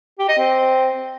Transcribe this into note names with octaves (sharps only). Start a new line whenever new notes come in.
G4
D#5
C4